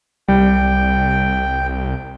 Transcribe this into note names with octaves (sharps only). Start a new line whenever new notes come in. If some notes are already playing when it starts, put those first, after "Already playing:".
C2 G3 G5